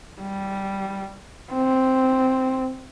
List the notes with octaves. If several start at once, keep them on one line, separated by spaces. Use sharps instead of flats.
G3
C4